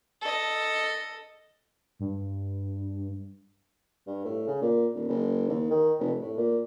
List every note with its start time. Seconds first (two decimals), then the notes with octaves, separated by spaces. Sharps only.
0.21 A4 D#5
2.00 G2
4.07 G2
4.25 A2
4.47 C#3
4.62 A#2
4.95 D#1
5.08 F#1
5.48 D#2
5.70 D#3
5.99 F1
6.20 A2
6.37 A#2